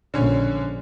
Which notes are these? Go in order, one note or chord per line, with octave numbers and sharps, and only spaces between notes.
A#1 D3 C#4 C#5